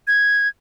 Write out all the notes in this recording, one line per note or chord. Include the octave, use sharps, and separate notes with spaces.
G#6